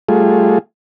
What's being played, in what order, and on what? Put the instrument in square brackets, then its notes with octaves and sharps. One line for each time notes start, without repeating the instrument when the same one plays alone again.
[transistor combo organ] G3 A3 F4 G#4